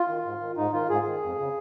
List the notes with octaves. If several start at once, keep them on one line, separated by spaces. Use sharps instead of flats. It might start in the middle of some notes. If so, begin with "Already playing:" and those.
Already playing: F4
D#3
G#2
D#3
G#2 D#4
D#3 F4
G#2 G#4
D#3
F2
C#3